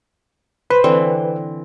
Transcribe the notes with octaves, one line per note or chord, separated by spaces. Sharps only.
B4 C5
D3 E3 C4